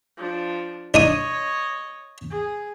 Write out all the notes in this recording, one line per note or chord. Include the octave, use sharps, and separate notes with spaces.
F3 D4
D4 D#4 C#5 D#5 D#6
G#4